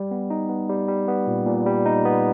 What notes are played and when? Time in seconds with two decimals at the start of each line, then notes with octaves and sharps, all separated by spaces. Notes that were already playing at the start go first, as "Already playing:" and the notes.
Already playing: G3
0.11 B3
0.30 D#4
0.50 B3
0.69 G3
0.88 G3
1.08 B3
1.27 A#2
1.46 A#2
1.66 G3
1.86 D#4
2.05 B3